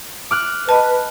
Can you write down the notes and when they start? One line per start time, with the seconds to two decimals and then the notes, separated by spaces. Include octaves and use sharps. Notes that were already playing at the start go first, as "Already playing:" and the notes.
0.31 D6 F6 F#6
0.69 B4 D#5 A5